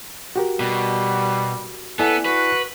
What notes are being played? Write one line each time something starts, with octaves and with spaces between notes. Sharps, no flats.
F#4 G4 A#4
B2 G3
B3 E4 A4 D5 G#5
F#4 B4